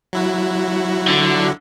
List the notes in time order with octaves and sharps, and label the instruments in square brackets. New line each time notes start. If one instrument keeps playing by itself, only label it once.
[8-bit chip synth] F#3 E4 F#4
[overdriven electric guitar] D3